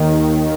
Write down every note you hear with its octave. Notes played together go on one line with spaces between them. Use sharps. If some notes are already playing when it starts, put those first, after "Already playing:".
Already playing: D#2 D#3